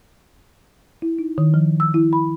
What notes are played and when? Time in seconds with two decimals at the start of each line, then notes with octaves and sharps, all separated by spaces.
1.02 E4
1.19 D#4
1.38 D#3
1.54 F3
1.80 E6
1.94 E4
2.13 B5